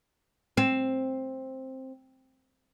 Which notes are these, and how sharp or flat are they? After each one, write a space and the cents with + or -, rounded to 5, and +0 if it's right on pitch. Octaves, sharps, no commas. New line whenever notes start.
C4 +10